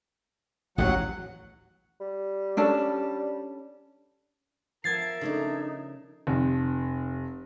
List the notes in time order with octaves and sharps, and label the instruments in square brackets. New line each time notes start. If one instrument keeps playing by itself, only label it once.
[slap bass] A1 D#2 G#2 [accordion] F#3 F#5
[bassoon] G3
[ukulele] C#4 D4 A4
[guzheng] F3 B3 A5 [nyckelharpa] A#4 E5 [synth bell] G#6 A6 C7
[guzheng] C#3 A3 D4 [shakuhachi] D#4
[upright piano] F1